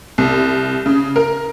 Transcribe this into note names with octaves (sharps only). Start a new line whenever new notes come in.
C2
C#3
A#4